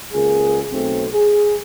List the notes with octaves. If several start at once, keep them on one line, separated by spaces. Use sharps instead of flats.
C#2 A#3 G#4
B1 A3 C4
G#4